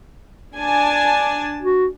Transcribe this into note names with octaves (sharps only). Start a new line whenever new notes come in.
D4 G#5 A5
F#4